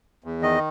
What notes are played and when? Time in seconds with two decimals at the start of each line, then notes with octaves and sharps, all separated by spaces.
0.24 E2
0.42 D#3 D#5